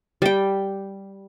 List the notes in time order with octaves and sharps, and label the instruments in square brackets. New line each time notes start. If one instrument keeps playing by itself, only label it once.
[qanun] G3 G5